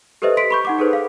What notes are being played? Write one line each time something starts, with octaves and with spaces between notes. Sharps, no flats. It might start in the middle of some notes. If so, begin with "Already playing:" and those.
G4 A4 B4 C5 D#5 E5
C6 B6 D7
B5 C#6 G6
D#4 F#5 D6
G#4 A4 B4 C5
F5